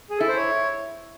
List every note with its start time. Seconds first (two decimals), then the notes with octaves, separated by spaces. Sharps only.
0.10 G#4
0.18 E4 A4
0.28 C5
0.36 C#5